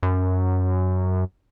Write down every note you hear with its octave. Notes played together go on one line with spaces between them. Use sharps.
F#2